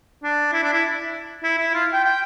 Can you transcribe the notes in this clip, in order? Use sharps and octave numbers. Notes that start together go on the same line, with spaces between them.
D4
E4
D4
E4
E4
E4
F4
G5
G5